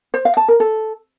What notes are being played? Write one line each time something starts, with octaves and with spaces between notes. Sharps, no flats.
C5
F5
A5
A#4
A4